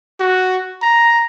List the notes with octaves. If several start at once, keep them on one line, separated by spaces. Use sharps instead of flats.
F#4
A#5